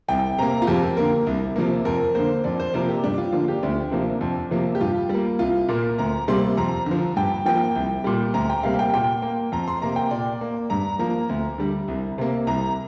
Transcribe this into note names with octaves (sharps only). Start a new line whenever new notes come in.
C2 G5
C3 A#3 A#5
F4
F2 G4
A#4
D3 A#3 A#4
C2
C3 F3 A#3
F2 A#4
D3 A#3 C5
F2 D5
C5
C3 F3 A#3 A#4
G4
G2 D4
F4
D3 F3 A#3 F4
G4
D2 D4
C3 F3 A#3
F2
C3 F3 A#3
G4
G2 F4
G3 A#3
C2 F4
A#2 A#3 A#4
D2 A#5
C3 G3 A#3 C6
F2 A#5
D3 F3
G2 G5
F3 A#3 G5
C2
A#2 G3
D2 A#5
G5
C3 G3 A#3 F5
G5
A#2 G5
A#3
F2 A#5
C6
C3 A#3 A#5
G5
A#2 D5
A#3
G2 A#5
F3 A#3 A#5
D2
D3 G3
C2
C3 A#3
C2 A#5